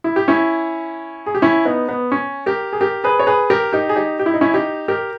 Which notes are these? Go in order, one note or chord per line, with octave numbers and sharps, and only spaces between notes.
E4
G4
C#4 E4
G#4
G4
C#4 E4
B3 D#4
B3
C#4
G4 A#4
G#4
G4 A#4
G#4 B4
C#5
G#4 B4
G4 A#4
D#4 G4
G#4
D#4 G4
G4
E4
D#4
C#4 E4
D#4 G4
G4 A#4